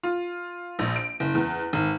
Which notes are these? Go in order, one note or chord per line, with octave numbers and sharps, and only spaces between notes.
F4
A#1
D7
F#1
E2
G#1